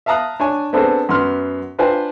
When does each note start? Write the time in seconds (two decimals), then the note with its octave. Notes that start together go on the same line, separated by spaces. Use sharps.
0.06 E5 F5 A5 A#5 D#6 F#6
0.40 D4 C#5 G#5
0.73 B3 C4 D4 G#4 A4 C5
1.09 F#2 B3 C6 F6
1.79 D4 F4 B4 C5 G5 G#5